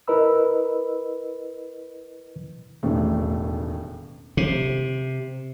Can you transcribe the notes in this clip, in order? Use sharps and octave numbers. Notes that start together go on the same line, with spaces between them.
E4 A#4 B4 D#5 B5 E6
E1 A1 D#2 A3
C3